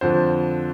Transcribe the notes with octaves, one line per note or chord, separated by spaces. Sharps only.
F2 D3 F3 C5